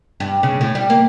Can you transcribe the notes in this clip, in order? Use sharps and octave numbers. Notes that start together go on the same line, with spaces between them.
G2
C#3
A2
G3
A#3